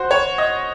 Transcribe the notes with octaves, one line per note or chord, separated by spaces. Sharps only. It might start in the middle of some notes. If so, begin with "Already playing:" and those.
Already playing: F#4 C5
C#5
D#5